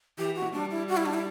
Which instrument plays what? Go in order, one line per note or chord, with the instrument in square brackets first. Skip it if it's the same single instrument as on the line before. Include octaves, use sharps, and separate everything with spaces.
[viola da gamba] E3 [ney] G4
[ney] F#4
[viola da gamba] G3 [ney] D4
[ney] E4
F#4
E4
D4
E4